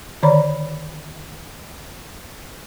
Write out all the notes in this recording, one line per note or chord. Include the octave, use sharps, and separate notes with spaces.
D3 D#3 C#5 D5 A#5 B5